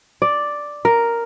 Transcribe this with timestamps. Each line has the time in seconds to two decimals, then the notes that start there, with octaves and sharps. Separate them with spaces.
0.22 D5
0.85 A#4